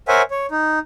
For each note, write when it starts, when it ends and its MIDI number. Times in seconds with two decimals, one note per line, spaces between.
0.08 0.22 70
0.08 0.22 72
0.08 0.22 73
0.08 0.22 76
0.08 0.22 78
0.08 0.22 80
0.31 0.46 73
0.51 0.79 63